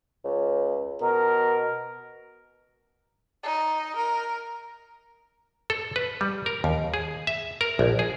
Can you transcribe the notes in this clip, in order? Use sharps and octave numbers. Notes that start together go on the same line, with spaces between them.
C#2
B2 A#4
D#4
A#4
A4
B4
G3
A#4
D#2
G#4
E5
A#4
A#1
G#4